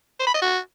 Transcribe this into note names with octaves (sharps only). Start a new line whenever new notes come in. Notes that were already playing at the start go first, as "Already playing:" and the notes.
C5
B5
D#5
F#4